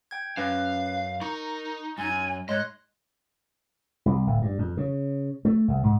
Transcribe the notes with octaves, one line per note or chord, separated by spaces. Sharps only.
G5 G#6
F#2 C#4 B4 F5
D#4 A#4 C#6
F#2 G#5
G#2 C#5 D#5 C6 F#6
C2
D1
G2
F2
C#3
A3
C2
G#2